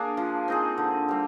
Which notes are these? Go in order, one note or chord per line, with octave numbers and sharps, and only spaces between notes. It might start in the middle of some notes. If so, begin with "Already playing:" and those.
Already playing: A#3 D4 G#4
F3
C4 D#4 G#4
D3
G3 C4